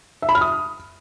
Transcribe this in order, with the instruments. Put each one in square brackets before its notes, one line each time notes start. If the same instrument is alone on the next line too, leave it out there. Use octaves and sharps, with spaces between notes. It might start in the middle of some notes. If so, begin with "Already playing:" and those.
[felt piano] E5
B5
F6
D#6